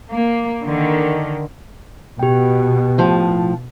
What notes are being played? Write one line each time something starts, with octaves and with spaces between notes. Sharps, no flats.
A#3
D3 D#3
B2 G4 G5
A2 F3